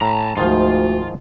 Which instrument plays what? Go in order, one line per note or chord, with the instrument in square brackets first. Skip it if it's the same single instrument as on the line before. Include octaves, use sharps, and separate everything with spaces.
[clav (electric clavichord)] A2 [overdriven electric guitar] A5 A#5
[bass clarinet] D2 [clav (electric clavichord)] G#2 D#3 F3 [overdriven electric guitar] F4